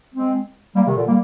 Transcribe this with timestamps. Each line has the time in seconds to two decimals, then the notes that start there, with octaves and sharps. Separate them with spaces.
0.14 G#3 C4
0.75 G3 A#3
0.86 C3 D#3
0.96 A#2 D3
1.06 G3 A#3